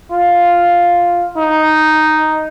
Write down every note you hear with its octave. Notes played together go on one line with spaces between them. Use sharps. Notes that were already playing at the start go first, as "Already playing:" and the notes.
F4
D#4